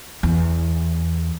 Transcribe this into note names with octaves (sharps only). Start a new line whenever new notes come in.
E2